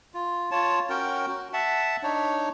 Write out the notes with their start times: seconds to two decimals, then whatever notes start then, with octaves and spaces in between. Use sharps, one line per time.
0.14 F4
0.51 F4 C#5 A5
0.90 C#4 F#4 A#4 G5
1.27 F#4
1.53 E5 F#5 A5
2.03 D4 D#4 C#5